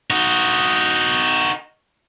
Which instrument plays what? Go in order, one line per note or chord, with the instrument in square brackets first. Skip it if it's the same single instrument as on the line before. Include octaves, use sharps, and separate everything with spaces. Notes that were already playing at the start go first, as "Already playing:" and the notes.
[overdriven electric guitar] D#4 F#4